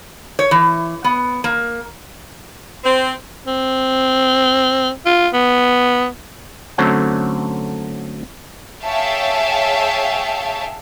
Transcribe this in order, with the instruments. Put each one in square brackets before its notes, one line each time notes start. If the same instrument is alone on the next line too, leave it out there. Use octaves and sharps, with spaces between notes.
[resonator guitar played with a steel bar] C#5
E3
B3
A#3
[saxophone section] C4
[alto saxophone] C4
F4
B3
[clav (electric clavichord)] D3 F#3 A3 C4 C#4
[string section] G#4 C#5 E5 F5 G5 A5